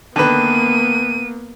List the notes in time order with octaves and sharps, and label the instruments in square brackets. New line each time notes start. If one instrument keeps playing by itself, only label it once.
[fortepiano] D3 D#3 B4 [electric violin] A#3 B3 [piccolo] D#7